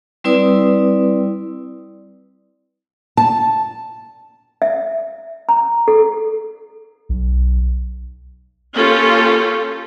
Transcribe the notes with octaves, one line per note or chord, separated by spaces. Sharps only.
G3 C4 E4 B4 D5 D#6
A5
E5
A#5
A4
B1
A#3 C#4 F4 G4 A4